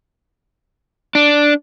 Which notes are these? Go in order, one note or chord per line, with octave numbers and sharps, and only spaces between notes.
D4